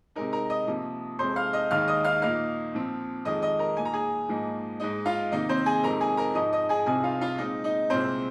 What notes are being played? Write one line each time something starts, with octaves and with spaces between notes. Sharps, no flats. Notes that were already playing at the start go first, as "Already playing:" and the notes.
C3 G#3 D#4 A#4
A#4 A#5
D#5 D#6
C3 F3 A#3
F2 C3 G#3 C5 C6
F5 F6
D#5 D#6
D#2 D#3 G#3 D#4 F5 F6
D#5 D#6
F5 F6
A#2 A#3 D#4 F5 F6
A#2 F3 C4
F2 D#3 G#3 D#5 D#6
D#5 D#6
A#4 A#5
A#2 A#3 D#4 G#5
A#5
G#4 G#5
G#2 F3 A#3 D#4
G#2 G#3 D#4 D#5
F4 F5
C3 D#3 A#3 D#4 D#5
C4 C5
G#4 G#5
F2 C3 G#3 D#4 A#4 A#5
G#4 G#5
A#4 A#5
G#2 F3 G#3 D#4 D#5 D#6
D#5 D#6
G#4 G#5
C2 C3 F3 C4 D#4 G#4 G#5
F4 F5
F4 F5
A#2 G#3 C4 D#4 D#5
D#4 D#5
C2 A#2 G#3 C4 C5